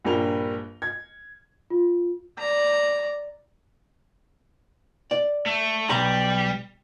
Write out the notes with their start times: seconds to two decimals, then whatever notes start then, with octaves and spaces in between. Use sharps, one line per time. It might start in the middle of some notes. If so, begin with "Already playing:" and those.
0.05 A#1 G2 G3 A#4 F7 G7
0.82 G#6
1.70 F4
2.38 D5 A#5
5.11 D5
5.46 A3
5.89 B1 G3 A#5 B5